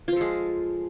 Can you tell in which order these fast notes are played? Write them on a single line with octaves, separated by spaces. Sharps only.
F4 F3 A4 G#3